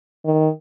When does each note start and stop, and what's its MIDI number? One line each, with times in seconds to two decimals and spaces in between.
0.25 0.48 51